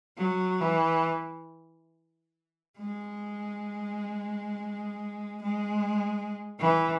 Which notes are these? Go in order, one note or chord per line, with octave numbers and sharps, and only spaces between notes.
F#3
E3
G#3
G#3
E3